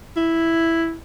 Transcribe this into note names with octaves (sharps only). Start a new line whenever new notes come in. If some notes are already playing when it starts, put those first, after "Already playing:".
E4